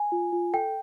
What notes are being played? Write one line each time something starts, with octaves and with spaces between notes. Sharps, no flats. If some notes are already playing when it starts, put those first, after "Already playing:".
Already playing: G#5
F4
F4
A4 G5